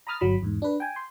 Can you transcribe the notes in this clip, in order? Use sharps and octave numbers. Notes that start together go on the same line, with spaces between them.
A#5 B5 D#6 F6 A6
G1 F#3 B5
E2 G#2
D4 B4
G5 G#5
C6